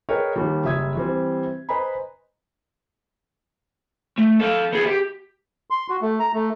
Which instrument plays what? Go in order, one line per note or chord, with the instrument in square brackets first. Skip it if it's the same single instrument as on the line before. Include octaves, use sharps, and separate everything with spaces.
[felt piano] G#4 A#4 B4 C#5 D#5 G5
D#2 D#3 G3
F#1 G3 E5 D#6 G#6
E3 G3 C4
B4 C5 D#5 G#5 A#5 B5
[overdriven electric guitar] A3
A4 F5
B3 G#4
G4
[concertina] C6
F#4
A3
A#5
A3